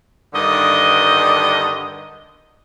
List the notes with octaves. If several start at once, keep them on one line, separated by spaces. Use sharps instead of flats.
G2 D3 D#3 D#5